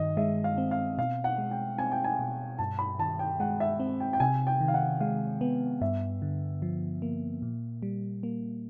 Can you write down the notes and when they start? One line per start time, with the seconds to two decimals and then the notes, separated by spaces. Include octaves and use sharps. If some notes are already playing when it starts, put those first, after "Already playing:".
Already playing: G2 D#3 D#5
0.17 G#3 E5
0.44 F5
0.58 C4
0.71 F5
0.98 B2 F5
1.24 F#5
1.38 G#3
1.51 G5
1.78 C4 G#5
1.92 G5
2.04 G#5
2.19 B2
2.59 G2 A5
2.79 B5
2.99 D#3 A5
3.19 G5
3.40 G#3 F#5
3.60 E5
3.80 C4
4.00 G5
4.13 G5
4.20 C3 G#5
4.47 G5
4.61 D#3
4.68 F5
4.74 F#5
5.00 G#3 F5
5.41 B3
5.81 G2 E5
6.22 D3
6.62 F3
7.02 A#3
7.42 A#2
7.82 G3
8.23 A#3